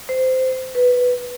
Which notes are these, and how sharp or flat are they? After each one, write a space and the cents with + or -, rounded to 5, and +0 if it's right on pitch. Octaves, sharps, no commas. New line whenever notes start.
C5 -15
B4 +0